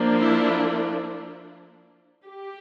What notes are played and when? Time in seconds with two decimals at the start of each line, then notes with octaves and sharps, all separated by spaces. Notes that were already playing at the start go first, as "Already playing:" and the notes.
Already playing: F3 A#3 D4
0.19 E4
2.25 G4